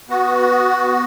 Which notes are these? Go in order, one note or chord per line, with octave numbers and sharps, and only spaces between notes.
B3 F#4